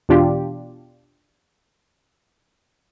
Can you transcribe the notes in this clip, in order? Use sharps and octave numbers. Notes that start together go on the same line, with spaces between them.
E2 B2 D4 F4 G4